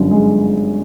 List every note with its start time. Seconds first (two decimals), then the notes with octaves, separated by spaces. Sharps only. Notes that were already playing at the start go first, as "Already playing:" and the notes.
Already playing: G1 F#2
0.11 G#3